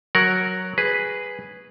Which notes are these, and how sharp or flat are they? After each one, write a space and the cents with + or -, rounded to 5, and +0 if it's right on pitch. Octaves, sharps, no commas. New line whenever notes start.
F#3 +0 A#4 +0 F#5 +0
G#4 -5 B4 +0